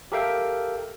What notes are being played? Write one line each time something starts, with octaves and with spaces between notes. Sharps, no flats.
G4 A4 A#4 E5 F5 G5